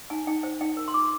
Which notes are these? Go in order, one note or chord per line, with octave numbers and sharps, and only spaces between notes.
D#4 G#5
D#4 G5
C5 G5
D#4 G5
A#4
C6
F4 D6